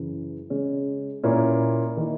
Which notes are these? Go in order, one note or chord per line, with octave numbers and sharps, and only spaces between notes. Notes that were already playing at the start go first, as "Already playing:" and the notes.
Already playing: F#2 C#3 E3
C#3 G#3 C#4
A#2 A#3 C#4 E4
D#3 A#3 E4